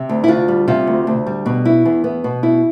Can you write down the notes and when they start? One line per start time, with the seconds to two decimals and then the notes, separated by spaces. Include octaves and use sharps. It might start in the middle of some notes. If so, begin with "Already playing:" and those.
Already playing: C3
0.09 D2
0.24 E4
0.28 D2 F4
0.48 G3
0.68 C3 F4
0.87 D2
1.07 D2
1.27 G3
1.46 B2
1.65 E4
1.85 E2
2.04 B3
2.24 B2
2.43 E4